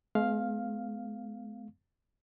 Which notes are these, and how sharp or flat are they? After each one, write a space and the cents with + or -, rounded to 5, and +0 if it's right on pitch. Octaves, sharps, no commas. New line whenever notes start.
G#3 +40 B3 +25 F5 +0